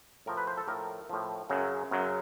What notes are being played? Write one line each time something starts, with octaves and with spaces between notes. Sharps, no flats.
A2 F3 A#4
B4
C5
A4
A2 F3 A#4
A2 F3
F#2 C#3 F#3
F#2 C#3 F#3